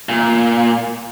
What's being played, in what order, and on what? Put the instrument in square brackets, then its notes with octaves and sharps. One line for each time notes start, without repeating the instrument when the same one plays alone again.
[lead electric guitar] A#2